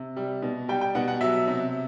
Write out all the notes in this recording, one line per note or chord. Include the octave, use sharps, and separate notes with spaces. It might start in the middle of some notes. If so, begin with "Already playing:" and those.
Already playing: C3
G3
B2
G3 G5
G5
B2 F#5
F#5
F#3 E5
C3